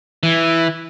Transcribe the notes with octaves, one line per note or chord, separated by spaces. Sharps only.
E3